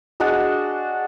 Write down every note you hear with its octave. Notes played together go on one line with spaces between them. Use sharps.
D4 F#4 G#4 D#5